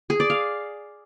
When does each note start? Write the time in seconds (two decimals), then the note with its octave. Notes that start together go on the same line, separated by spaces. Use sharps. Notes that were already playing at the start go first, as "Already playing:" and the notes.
0.10 G#4
0.20 D5
0.30 F5